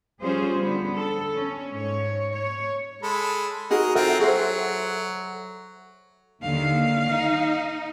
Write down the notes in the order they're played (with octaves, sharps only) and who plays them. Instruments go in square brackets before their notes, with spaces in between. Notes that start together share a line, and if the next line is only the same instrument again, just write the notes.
[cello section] F3 G3 C#4 F4 G#4 C5
D3 B3
A4
C#4
G#2 C#5
C#5
[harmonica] G#3 A4 B5
[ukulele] D#4 F#4 G#4 [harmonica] A#4 D#5
[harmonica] C4 F4 A#4 [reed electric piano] A4 E5 F#5
[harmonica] F#3 [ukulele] G#4 C5
[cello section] D#2 D3 D#3 [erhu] F5
[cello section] D#4